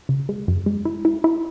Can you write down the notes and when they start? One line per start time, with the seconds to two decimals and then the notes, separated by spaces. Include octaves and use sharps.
0.09 C#3
0.29 G#3
0.48 F#2
0.66 G#3
0.85 E4
1.05 E4
1.24 E4